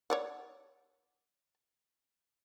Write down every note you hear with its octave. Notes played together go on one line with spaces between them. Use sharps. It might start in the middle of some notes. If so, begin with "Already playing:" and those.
C#5 D5 F#5